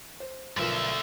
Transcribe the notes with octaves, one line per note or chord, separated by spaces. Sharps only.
C5
B1 D3 F3 A#4 E5